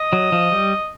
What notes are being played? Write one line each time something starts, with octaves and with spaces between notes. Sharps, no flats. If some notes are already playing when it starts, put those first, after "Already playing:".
Already playing: D#5
F#3
F3
G3